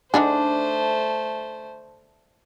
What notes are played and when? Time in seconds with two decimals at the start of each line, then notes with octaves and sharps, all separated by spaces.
0.14 D3 A3 D4 D#4 G#4 C5